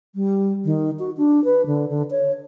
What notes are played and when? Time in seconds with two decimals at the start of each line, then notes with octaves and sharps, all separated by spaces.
0.15 G3
0.65 D#3
0.99 F#4
1.17 D4
1.44 B4
1.66 D3
1.89 D3
2.11 C#5